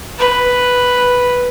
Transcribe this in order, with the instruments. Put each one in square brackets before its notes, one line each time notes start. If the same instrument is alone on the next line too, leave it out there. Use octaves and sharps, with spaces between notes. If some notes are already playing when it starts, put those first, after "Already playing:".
[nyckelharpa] B4